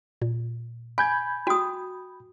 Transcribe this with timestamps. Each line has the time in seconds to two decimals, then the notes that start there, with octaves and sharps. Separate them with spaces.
0.22 A#2
0.98 G#5 B5 G6 G#6
1.47 F#4 G5 D#6